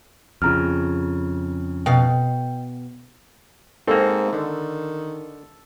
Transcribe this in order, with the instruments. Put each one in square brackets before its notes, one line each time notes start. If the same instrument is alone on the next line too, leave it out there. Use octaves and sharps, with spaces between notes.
[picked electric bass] F2 C#3 [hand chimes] F4 A#5 F6
[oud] B2 F5 [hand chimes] G5
[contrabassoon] G#2 [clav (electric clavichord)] A#3 C4 [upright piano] A4
[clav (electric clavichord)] D3 [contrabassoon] D#3